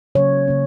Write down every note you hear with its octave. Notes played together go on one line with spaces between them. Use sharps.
C#3 F#3 A#3 C#4 C#5
C#3 F#3 A#3 C#4